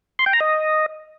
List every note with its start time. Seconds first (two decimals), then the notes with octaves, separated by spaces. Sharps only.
0.19 C6
0.26 G5
0.33 A#5
0.40 D#5